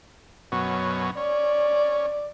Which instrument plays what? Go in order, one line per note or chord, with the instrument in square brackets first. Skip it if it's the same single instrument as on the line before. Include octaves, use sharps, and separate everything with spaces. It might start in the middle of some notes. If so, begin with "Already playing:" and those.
[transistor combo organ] F#2 B2 C#4
[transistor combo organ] C#4 [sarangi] D5